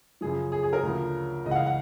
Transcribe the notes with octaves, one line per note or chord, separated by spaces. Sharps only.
F#2 C#3 F3 G#4
G#4
G#4
A#4
D2 C#3 F3
C#2 C#3 E3 D#5
F#5
F5
F#5